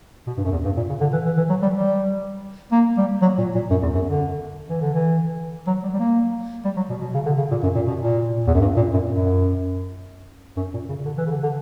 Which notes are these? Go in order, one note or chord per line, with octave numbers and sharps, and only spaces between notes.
B2
G2
F#2
E2
G2
A#2
C#3
D3
E3
E3
E3
F#3
G3
G3
A#3
G3
F#3
A#2
A#2
F#2
E2
F#2
D3
E3
D3
E3
F#3
G3
G3
A#3
G3
F#3
B2
B2
C#3
D3
C#3
A#2
F#2
A#2
B2
A#2
E2
F#2
G2
A#2
F#2
F#2
F#2
A#2
C#3
D3
E3
C#3
D3
D3